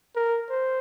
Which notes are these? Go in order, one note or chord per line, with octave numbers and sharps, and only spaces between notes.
A#4
C5